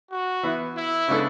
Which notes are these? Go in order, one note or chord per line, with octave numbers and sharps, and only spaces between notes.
F#4
E3 B3 E4
E4
C#3 G#3 B3 D4 A4